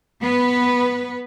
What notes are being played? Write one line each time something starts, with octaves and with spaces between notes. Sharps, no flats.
B3 B4